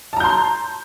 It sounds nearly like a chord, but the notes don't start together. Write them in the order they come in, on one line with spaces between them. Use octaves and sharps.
A5 A#5 G6 C6